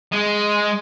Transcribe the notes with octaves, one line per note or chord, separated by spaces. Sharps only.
G#3